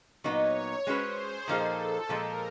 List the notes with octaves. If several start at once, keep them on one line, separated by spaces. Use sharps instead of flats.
A#2 F#3 B3 D#4 C#5
G#3 C#4 F#4 B4 C5
G#4
A#2 F3 A#3 D#4 G#4 A4
A#2 F3 G#3 A#4